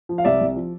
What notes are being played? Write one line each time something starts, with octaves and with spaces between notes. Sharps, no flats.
F3
F5
C2 D5 E5
C2
F3